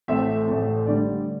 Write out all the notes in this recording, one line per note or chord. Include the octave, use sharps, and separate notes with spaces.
A1 A2 A3 C4 E5
A1 A2 A3 C4
D3 G3 D5